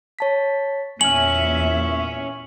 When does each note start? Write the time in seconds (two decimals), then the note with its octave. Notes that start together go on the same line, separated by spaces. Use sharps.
0.19 C#5 A5 B6
1.01 E2 A#2 C#4 E5 G#5 F6 F#7